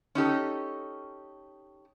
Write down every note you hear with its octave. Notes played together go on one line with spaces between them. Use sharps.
C#4 D#4 G4 A4